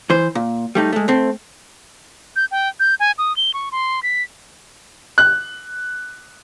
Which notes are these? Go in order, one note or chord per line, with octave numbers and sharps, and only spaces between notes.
E3 C5
A#2
G3 A3 D#4
G#3 A3
A3 C4
G6
G5
G6
G#5
D#6
G7
C#6
C6
B6
F#6